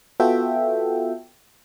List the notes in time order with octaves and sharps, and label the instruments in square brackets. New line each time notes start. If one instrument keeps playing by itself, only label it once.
[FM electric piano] B3 F4 F#4 A4 E5 G5